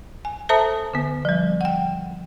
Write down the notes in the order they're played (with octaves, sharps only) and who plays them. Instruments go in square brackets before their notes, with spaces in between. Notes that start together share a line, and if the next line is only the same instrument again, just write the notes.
[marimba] G#5
A4 C5 E5 A5 A#5 D#6
D3 B3
F3 G3
F#5 G5